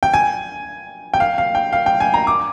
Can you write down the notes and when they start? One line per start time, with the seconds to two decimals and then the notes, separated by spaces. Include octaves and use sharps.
0.03 G5
0.14 G#5
1.14 G5
1.20 F5
1.38 F5
1.55 G5
1.73 F5
1.86 G5
2.00 G#5
2.14 A#5
2.27 D6